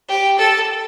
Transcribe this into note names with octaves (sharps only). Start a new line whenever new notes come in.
G4
A4